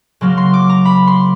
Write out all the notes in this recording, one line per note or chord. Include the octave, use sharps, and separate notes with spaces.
C#3 F#3 A#3 C6
C6
D6
A#5
B5
C6